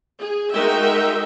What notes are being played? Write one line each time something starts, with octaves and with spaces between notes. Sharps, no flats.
G#4
G#3 D#4 F#4 A#4 E5 G5